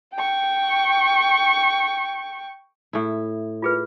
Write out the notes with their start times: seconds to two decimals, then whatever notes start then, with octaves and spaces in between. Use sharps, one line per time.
0.15 G5 C#6
2.93 A2 E4
3.62 F4 G#4 B4